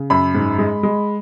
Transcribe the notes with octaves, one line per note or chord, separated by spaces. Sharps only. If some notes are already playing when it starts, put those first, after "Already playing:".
Already playing: C#3
F#2 B5
G#2
G#3
G#3